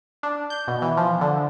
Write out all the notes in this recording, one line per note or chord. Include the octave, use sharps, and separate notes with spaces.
D4
G6
B2
E3
F3
D3